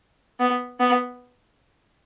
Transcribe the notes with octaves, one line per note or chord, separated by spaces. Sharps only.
B3
B3